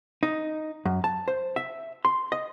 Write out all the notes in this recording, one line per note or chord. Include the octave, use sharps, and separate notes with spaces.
D#4
F#2
A5
C5
E5
C6
D#5